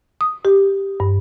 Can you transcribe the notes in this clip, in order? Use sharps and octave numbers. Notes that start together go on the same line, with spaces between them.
D#6
G4
G2